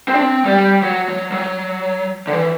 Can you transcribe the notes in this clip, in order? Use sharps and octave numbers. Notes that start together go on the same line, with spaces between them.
C4
D4
C4
G3
F#3
F#3
F#3
D3
E3